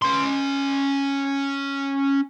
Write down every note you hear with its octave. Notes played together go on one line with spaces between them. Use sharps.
C#4 C6